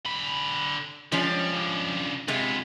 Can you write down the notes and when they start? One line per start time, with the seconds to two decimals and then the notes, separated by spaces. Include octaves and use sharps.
0.06 D3 B5
1.12 F3 G3 G#3 C#4
1.53 C#3 D4
2.28 C3 G#3 B3 F4